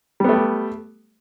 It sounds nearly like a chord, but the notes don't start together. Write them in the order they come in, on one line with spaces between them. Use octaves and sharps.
G3 B3 A3 G4